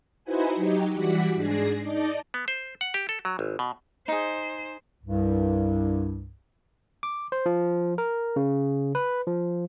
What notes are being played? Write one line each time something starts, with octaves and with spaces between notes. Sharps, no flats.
D#4 E4 F#4 B4 C5 G#5
F#3 D#4 G4
E3 G3 F#4 F#5 D6 B6
G#2 D4 G#4 A#6 C7
D#4 D5 D#5 A5
B3
C5
F#5
G4
A4
F#3
G#1
B2
D#4 G#4 C5
C2 G2
D6
C5
F3
A#4
C#3
B4
F3